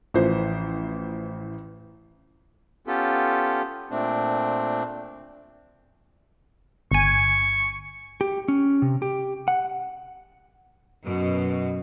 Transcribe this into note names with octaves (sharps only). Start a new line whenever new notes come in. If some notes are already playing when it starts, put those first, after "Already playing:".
A1 E3 F3 C5
B3 C#4 F4 G4 A4
A#2 A3 C4 D4
G1 G#5 C#6
G4
C#4
C3
G4
F#5
F#2 B2